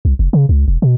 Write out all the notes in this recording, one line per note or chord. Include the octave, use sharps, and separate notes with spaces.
C2
F1
C#3
C#2
E1
B2